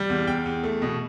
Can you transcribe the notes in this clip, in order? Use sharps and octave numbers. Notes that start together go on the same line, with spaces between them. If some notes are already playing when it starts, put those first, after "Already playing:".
Already playing: G3
E2
E2 G5
E2
A3
B2